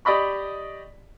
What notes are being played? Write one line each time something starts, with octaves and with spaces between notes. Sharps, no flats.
G4 D5 D#5 B5 C#6